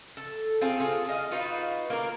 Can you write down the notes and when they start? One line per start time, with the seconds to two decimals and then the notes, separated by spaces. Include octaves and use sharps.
0.17 A4
0.61 C4 F4 G#4 A4
0.80 F4 G#4 A4
1.09 D#5 F5
1.32 D#4 F4 F#4 B4
1.90 A#3 A#4